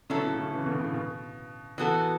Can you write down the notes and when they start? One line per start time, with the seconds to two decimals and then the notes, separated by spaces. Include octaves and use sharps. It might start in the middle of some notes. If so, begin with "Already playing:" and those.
0.10 B2 D3 F#3 C#4 E4 A4
0.24 A2 C#3
0.38 A2 C#3
0.52 C#3 E3
0.66 B2 D3
0.79 A2 C#3
0.94 B2
1.78 E3 B3 F#4 A4